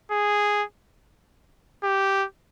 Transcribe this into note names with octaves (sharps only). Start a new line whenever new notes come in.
G#4
G4